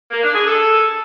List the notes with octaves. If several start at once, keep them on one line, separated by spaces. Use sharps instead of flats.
A#3
D4
G#4
A4